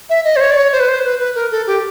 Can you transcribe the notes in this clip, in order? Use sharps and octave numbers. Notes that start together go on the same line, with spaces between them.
E5
D#5
C5
C#5
D5
C#5
C5
B4
C5
B4
B4
A#4
A4
G4